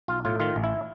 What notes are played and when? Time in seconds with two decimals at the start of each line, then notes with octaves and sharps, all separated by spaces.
0.08 B1 F4
0.25 A2 F4
0.40 D#3 F4
0.56 A1
0.64 E4